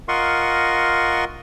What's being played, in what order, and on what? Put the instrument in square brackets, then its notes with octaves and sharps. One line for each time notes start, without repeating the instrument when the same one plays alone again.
[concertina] F4 A#4 D#5 F#5 C6 C#6